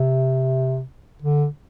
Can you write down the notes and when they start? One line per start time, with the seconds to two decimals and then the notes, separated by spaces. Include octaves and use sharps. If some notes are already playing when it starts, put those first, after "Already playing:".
Already playing: C3
1.22 D3